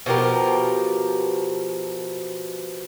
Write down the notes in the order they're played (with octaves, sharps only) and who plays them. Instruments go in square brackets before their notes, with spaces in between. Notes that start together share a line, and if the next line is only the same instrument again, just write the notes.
[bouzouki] B2 F3 G4 A#4